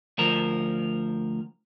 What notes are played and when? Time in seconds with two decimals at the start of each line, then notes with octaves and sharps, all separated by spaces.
0.18 D2 F3 A#4